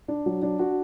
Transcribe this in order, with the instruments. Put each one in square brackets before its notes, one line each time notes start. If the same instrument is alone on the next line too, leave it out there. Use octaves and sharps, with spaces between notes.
[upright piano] D4
F#3
D4
F#4